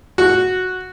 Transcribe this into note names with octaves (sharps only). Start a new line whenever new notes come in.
F#4